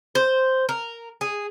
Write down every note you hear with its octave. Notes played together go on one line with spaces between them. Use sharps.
C5
A#4
G#4